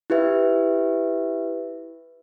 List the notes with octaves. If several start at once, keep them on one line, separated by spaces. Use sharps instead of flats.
E4 G4 B4 E5